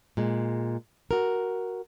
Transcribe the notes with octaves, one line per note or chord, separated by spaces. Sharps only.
A#2 G#3
F#4 A#4